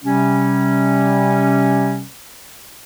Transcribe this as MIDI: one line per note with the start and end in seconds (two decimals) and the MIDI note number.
0.03 2.03 48
0.03 2.03 55
0.03 2.03 61